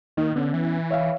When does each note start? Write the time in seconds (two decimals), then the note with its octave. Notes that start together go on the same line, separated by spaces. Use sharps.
0.17 D#3 A#3 D#4
0.36 D3 B3 C#4
0.54 E3
0.91 C#5 E5 F5